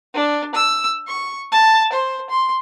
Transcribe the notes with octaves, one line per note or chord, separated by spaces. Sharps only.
D4
E6
C#6
A5
C5
C6